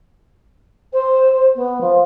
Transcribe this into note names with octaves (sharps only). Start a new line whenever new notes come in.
C5
B3
F3